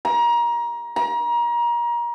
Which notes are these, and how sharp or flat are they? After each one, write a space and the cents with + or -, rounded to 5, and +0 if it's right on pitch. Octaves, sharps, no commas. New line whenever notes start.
A#5 +25
A#5 +30